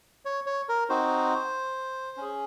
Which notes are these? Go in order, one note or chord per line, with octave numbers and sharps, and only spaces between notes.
C#5
C#5
A#4
C4 D#4 F#4 C5
C#4 G#4